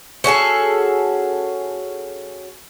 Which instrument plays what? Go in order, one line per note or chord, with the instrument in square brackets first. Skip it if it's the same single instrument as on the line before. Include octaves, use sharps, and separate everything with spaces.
[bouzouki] C#4 F#4 G#4 A4